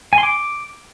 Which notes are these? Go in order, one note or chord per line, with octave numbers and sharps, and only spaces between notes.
G#5
C6
D6